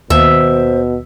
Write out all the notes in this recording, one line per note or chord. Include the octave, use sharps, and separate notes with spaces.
D#2 B2 C5 E5